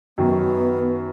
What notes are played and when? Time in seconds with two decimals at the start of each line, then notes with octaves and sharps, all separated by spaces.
0.18 F#2 D#3 F#3 B3